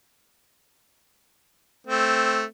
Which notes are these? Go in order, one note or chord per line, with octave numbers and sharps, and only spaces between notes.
A3 C4